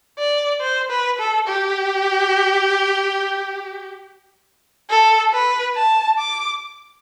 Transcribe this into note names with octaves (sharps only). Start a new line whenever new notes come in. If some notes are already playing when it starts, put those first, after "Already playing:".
D5
C5
B4
A4
G4
A4
B4
A5
D6